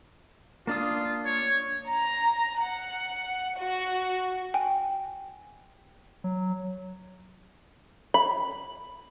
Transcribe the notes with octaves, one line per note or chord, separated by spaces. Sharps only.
A#3 D4 F4 D#6
C#5
A#5
F#5
F#4
G5 G#5
F#3
B5